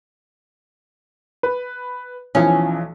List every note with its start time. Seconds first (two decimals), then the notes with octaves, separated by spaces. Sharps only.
1.43 B4
2.35 B1 E3 F3 C#4